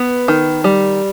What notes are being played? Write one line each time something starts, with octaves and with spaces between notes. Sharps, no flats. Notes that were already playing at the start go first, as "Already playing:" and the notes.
Already playing: B3
D#3
G3